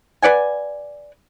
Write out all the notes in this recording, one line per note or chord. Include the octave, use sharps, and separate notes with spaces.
B4 D5 F#5 G#5